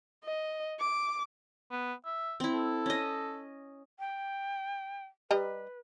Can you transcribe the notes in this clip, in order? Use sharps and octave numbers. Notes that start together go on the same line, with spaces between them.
D#5
D6
B3
E5
C4 E4
A4
C#4 D#5
G5
G3 B4 D#5 A#5